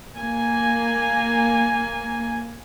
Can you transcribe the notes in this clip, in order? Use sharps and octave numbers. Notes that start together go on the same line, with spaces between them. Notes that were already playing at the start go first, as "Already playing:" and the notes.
A#3 G#5